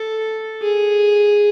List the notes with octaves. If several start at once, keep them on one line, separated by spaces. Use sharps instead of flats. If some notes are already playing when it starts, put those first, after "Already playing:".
Already playing: A4
G#4